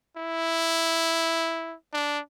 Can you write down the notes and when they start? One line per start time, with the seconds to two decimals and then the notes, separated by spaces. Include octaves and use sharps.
0.17 E4
1.93 D4